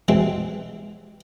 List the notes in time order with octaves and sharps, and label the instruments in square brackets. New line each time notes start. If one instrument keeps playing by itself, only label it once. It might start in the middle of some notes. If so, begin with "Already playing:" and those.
[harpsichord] E3 F#3 G#3 C4